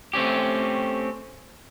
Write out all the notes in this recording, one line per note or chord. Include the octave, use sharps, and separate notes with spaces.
A3 C4 C#4 G4